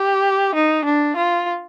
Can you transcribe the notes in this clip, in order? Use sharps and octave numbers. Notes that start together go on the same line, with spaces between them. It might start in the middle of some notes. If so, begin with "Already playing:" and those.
Already playing: G4
D#4
D4
F4